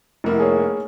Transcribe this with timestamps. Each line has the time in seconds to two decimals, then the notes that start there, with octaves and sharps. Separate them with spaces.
0.24 F1 A#3 E4
0.40 G#4 C#5